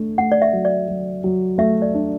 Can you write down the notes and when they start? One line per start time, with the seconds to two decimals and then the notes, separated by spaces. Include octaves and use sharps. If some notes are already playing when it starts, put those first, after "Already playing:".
Already playing: A3 D4
0.18 A3 F#5
0.32 D5
0.42 E5
0.53 F#3
0.65 D5
0.88 F#3
1.24 F#3
1.58 A3 E5
1.82 D5
1.94 D4